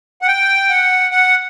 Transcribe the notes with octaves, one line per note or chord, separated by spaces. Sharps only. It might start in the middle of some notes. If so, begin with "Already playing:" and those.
F#5
G5
F#5
F#5